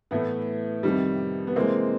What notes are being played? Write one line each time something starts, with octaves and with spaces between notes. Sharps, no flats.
A2 E3 A3 B3
F2 C3 D#3 G3
B3
C3 E3 G#3 A#3 C4